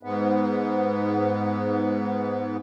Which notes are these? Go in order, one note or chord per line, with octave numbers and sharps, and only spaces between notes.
G#2 B3